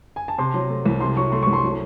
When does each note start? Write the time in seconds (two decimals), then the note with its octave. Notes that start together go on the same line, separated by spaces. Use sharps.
0.16 G#5
0.28 A5
0.38 C3 C6
0.54 F#3
0.70 A3
0.86 C2
1.01 C3 C6
1.16 F#3 C#6
1.32 A3 C6
1.42 C2 C#6
1.53 C6
1.63 F#3